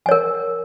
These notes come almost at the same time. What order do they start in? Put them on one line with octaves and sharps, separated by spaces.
G#5 C#5 A#4